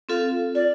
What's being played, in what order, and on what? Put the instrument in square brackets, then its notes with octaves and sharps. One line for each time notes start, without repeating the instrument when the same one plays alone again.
[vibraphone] C4 F4 A4 F5
[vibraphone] F4 [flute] D5